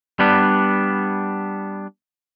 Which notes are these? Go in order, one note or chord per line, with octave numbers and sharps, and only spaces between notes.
G3 B3 D4